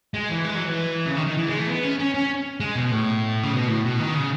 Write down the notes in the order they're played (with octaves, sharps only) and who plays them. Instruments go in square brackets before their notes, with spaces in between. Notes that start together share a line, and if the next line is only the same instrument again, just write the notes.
[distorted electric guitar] G#3
E3
G#3
F#3
E3
C#3
D#3
D#3
E3
G#3
A3
B3
C#4
C#4
C#4
G#3
B2
A2
C#3
B2
A2
B2
D#3
C#3